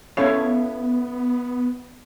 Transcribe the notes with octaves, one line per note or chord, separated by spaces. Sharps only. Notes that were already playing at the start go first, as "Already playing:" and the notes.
B3 C#4 E4 A4 C#5 F5